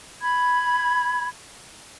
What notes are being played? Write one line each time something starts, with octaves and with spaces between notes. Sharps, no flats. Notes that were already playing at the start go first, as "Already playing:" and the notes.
B5 G#6